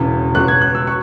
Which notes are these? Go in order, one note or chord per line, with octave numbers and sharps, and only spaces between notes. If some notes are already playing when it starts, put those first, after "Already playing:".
Already playing: E1 E2 C#3 E3
C#2 B2 F#6
G#6
F#6
E6
C#6